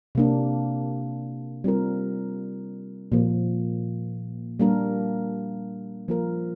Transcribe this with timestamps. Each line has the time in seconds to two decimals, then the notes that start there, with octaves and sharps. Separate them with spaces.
0.15 C3 A#3 D4
1.64 G3 C4 F4 A#4
3.12 A#2 F3 A#3
4.60 G3 A#3 D4 A#4
6.08 F3 A#3 F4 A#4